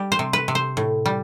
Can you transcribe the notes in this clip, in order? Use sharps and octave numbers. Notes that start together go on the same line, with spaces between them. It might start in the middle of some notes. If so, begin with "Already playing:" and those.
Already playing: G3 G4
C5
C3
B4
C3
C5
A2
G3